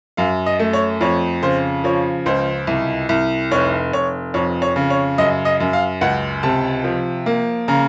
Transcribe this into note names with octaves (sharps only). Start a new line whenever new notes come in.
F#2 F5
D#5
A3
C#5
F2 C#5
C#3 C5
F3 C#5
C#2 C5
C2
C2
F1 C#5
F1 C#5
F2 C#5
C#5
C#3
C#5
F#2 D#5
D#5
F#2
F5
C#2 F#5
C3 A5
F3
A#3
C#3 A#5